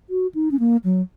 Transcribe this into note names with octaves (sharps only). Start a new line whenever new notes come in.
F#4
D#4
C#4
A#3
F#3